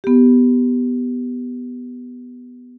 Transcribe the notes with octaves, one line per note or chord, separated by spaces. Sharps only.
B3 G4